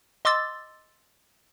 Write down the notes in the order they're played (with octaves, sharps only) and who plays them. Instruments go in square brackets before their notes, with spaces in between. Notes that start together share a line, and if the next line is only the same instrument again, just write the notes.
[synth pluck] D#5 C6 D6 E6 A6